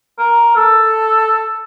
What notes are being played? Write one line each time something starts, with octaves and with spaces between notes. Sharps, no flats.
A#4
A4